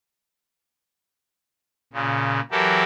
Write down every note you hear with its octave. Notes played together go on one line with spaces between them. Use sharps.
A#2 C#3
E3 F#3 F#4 G4 A4 A#4